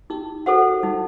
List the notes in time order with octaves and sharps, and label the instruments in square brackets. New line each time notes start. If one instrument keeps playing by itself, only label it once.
[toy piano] D#4 [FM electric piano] G4
[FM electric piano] F#4 [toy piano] A4 C5 F#5
[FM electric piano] G3 [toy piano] D#4